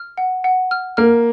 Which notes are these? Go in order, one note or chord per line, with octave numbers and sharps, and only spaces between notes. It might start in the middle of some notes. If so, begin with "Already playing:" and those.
Already playing: F6
F#5
F#5
F6
A#3 F6